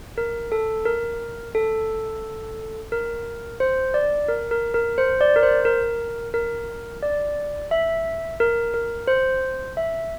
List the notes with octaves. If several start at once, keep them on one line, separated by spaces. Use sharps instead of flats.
A#4
A4
A#4
A4
A#4
C5
D5
A#4
A#4
A#4
C5
D5
A#4
C5
A#4
A#4
D5
E5
A#4
A#4
C5
E5